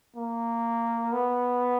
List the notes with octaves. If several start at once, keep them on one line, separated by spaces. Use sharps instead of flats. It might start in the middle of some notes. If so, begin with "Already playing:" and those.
A#3
B3